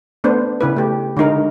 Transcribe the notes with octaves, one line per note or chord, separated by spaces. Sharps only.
A3 B3 D4 C5
C#3 E4 B4
A3 G4
D3 G#3 D#4 A#4